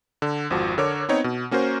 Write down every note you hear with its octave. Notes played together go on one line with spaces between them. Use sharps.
D3
G#1 F2 F3 F#4
D3 A#4 C#5 D6
B3 C4 D#4 C#5
B2
A#3 C#4 F#4 A#4 C5